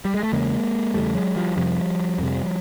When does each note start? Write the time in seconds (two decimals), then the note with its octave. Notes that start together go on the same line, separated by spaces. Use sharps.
0.05 G3
0.14 G#3
0.23 A3
0.32 E2 C#3 G#3 A#3
0.94 E2 C#3 G3 A3
1.15 F#3 G#3
1.36 F3 G3
1.56 F2 C3 F3 G3
2.19 F2 C3